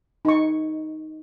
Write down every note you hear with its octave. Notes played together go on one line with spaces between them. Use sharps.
D#4 C#6